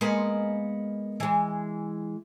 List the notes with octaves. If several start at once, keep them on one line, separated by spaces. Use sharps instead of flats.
G#3 A#3 B3
E3 G#3